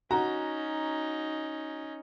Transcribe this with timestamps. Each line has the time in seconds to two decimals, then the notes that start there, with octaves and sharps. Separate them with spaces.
0.11 C#4 D#4 F#4 A#5